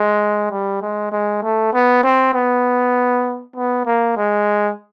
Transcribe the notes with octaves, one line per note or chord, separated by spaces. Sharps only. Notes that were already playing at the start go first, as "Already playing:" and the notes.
Already playing: G#3
G3
G#3
G#3
A3
B3
C4
B3
B3
A#3
G#3